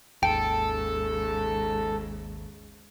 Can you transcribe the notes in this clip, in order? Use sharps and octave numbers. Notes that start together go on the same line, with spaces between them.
G#1 D#2 G#2 C#3 A4 G5